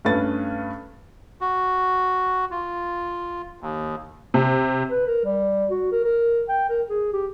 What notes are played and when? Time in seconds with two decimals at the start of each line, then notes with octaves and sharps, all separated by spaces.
0.05 G2 A3 C#4 B4 A6
1.41 F#4
2.51 F4
3.61 D#2
4.34 C3
4.90 B4
5.07 A#4
5.25 G3
5.70 F#4
5.92 A#4
6.04 A#4
6.48 G5
6.69 A#4
6.89 G#4
7.13 G4